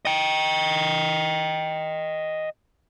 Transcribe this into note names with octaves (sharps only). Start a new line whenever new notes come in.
D#5 G5